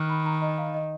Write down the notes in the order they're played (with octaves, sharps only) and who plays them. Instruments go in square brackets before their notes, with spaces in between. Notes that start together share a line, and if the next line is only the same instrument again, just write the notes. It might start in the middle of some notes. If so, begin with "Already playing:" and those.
Already playing: [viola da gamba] D#3 [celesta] F6 F#6
[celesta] B5
A#5
D#5
F5
D#5